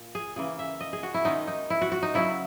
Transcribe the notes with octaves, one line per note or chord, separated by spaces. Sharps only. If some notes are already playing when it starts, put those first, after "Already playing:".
Already playing: A#2
G#4
C#3 E3 A#3 G#4
E5
D#5
G#4
F#4
E4
D#3 G#3 C#4 D#4
D#4
E4
F#4
F#4
D#4
C#3 F#3 C#4 E4